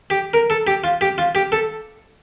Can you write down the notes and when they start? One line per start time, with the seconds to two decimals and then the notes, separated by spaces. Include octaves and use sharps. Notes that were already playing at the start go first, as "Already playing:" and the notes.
0.10 G4
0.34 A#4
0.50 A4
0.67 G4
0.84 F4
1.01 G4
1.18 F4
1.35 G4
1.52 A4